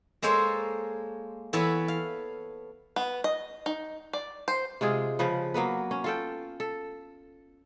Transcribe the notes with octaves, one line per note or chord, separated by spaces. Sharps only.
G#3 A#3 A4 C5 C#5
E3 B3 A4 C#5 A5 B5
F5
B3
D#5
D#4
D5
C5
C3 G#3 F4 G#4
C#3 F3 B4
F#3 A#3 B3 B4
C#4
F4 A4 G5
A4